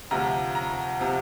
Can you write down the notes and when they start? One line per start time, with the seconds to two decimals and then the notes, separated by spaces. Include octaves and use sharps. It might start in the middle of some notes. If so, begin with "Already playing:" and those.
0.11 D2 C3 F3 A#5
0.55 A#5
1.00 C3 F3